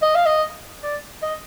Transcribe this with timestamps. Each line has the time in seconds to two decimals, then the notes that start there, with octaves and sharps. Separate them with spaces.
0.02 D#5
0.15 F5
0.26 D#5
0.83 D5
1.23 D#5